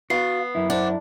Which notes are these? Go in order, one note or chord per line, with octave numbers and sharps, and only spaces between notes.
B3 F#4 F5 C7
F#2 E4
D4 C5 F#5